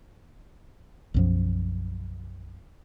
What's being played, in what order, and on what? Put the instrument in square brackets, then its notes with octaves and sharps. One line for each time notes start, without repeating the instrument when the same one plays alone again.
[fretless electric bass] B1 F#2 F3